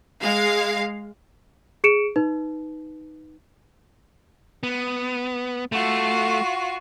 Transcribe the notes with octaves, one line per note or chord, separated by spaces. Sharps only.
G#3 F5
G#4 C#7 D7 E7
D#4 B4
B3
A3 F4 F#4